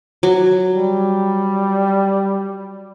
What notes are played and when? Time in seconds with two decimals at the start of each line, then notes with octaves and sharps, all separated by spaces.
0.23 F#3
0.75 G3